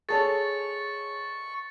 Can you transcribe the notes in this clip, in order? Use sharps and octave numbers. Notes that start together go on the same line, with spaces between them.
G#4 A4 C#5 C#6 A6